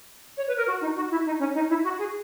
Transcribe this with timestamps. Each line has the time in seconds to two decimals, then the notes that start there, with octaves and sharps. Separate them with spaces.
0.37 C#5
0.47 B4
0.57 A#4
0.67 F#4
0.81 D#4
0.96 F#4
1.10 E4
1.25 D#4
1.39 C#4
1.54 D#4
1.69 E4
1.83 F#4
1.98 G#4